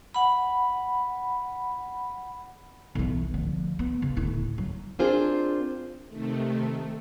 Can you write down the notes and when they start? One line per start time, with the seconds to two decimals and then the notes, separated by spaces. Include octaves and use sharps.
0.14 F#5 B5
2.95 B1 E3
3.34 D2 F3
3.79 B3
4.02 C#3
4.17 D1 E4
4.58 F#3
4.99 C4 D4 F4 G#4 A#4 C5
6.07 C3 D#3 A3